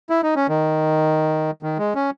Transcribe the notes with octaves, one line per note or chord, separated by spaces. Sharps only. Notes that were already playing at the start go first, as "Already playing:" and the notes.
E4
D#4
C#4
D#3
D#3
G#3
C#4